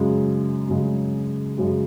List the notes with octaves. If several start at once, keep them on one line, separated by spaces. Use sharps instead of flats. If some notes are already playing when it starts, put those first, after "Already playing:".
Already playing: F#2 C#3 G#3
F#2 C#3 G#3
F#2 C#3 G#3